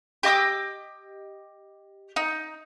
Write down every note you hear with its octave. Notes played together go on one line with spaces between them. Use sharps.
G4 D#5 D6 E6
D#4